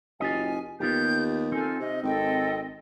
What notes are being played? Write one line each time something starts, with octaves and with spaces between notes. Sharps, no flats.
F#1 F4 G4 D#5 G#5
D#2 B3 F4 G4 G6
C4 D#4 F4 A4 G#5
C3 D#5
G#1 A4 D#5 G5